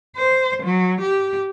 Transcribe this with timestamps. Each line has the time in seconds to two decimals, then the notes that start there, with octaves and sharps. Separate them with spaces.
0.16 C5
0.63 F#3
1.01 G4